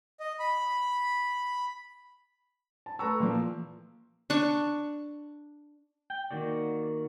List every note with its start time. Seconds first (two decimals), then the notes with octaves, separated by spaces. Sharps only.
0.20 D#5
0.40 B5
2.86 A5
2.99 A3 B4 A5 A#5 C#6 E6
3.20 A#2 E3 F3 A#3
4.30 D4 C#6
6.10 G5
6.31 D#3 A#3 F#4 D5